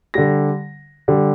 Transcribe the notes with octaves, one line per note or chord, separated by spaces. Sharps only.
D3 G3 A#6
D3 G3